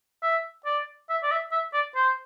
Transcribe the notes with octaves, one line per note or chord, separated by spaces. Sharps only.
E5
D5
E5
D5
E5
E5
D5
C5